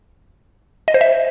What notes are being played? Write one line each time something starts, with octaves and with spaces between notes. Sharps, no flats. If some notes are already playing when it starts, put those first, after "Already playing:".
D#5
C5
E5